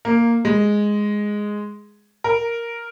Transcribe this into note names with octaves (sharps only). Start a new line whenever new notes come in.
A#3
G#3
A#4